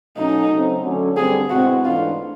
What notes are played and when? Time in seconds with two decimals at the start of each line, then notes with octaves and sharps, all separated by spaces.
0.16 B2 F#3 A3 C#4 D#4
0.51 C#3 F#3 A3 C4
0.83 D3 F#3 A3 C#4
1.16 G2 D3 G3 C4 G#4
1.50 B2 G#3 C4 E4 F#4
1.84 G#2 E3 A3 D4 F4